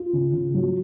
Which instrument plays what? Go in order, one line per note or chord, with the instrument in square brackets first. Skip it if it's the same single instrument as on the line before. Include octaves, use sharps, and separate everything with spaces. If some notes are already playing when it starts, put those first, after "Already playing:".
Already playing: [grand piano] F4
C#3
C#3
F#3